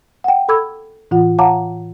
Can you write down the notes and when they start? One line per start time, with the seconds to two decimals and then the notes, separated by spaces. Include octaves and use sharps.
0.24 F#5 G5
0.49 A4 B5 D6 E6 G#6
1.11 A2 E3 F4 F#5
1.39 C#5 F5 F#5 A5 A#5 D6